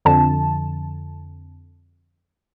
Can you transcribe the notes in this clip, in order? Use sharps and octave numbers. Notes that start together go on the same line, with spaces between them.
F2 D3 A5